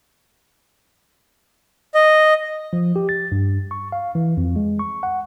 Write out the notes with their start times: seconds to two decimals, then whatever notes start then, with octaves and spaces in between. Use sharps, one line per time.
1.95 D#5
2.73 F3
2.96 G4
3.09 A6
3.32 G2
3.71 C#6
3.92 F5
4.15 E3
4.37 F2
4.56 G#3
4.79 C#6
5.03 F#5